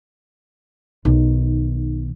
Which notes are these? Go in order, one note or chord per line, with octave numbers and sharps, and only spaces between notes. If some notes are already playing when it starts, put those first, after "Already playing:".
B1 D#3